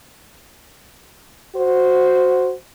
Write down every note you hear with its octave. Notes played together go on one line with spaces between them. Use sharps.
F#4 C5